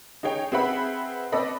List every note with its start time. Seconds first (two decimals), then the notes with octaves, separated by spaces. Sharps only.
0.23 D#4 G#4 C#5 G5
0.52 C4 G#4 B4 E5 F#5 B5
1.32 C4 A4 B4 D5 D#5 B5